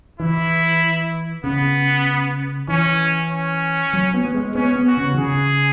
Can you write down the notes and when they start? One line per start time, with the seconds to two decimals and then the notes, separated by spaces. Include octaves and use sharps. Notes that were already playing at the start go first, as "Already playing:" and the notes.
0.20 E3 E4
1.44 C#3 B3
2.68 E3 C#4
3.30 C#4
3.93 F#3
4.14 B3
4.25 B3
4.34 G#3
4.55 B3 C#4
4.76 B3
4.87 F#4
4.97 C#3
5.14 E3
5.18 C#3 G#4